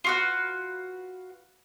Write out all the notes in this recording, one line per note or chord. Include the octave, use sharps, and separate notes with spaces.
F4 F#4 B4